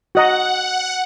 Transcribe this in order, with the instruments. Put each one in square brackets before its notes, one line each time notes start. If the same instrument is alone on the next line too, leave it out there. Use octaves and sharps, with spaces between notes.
[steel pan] F#4 D#5 A#5 [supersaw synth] F#5